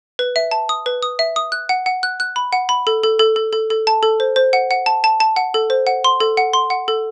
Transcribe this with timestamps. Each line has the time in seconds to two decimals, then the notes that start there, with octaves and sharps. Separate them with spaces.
0.19 B4
0.36 E5
0.51 A5
0.69 D#6
0.86 B4
1.03 D#6
1.19 E5
1.36 D#6
1.52 F#6
1.69 F#5
1.86 F#5
2.03 F#6
2.20 F#6
2.36 B5
2.53 F#5
2.69 B5
2.87 A4
3.03 A4
3.19 A4
3.36 A4
3.53 A4
3.70 A4
3.87 A5
4.03 A4
4.20 C5
4.36 C5
4.53 F#5
4.71 F#5
4.86 A5
5.04 A5
5.20 A5
5.36 F#5
5.54 A4
5.70 C5
5.87 F#5
6.04 C6
6.20 A4
6.37 F#5
6.53 C6
6.70 F#5
6.88 A4